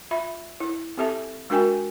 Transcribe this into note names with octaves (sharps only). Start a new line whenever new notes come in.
F4 E5 B5
E4
C4 G4 A4 E5 A5
G#3 D4 F#4 A#4 G5 G#5